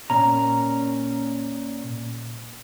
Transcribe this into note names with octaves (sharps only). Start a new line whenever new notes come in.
A#2 C#4 A#5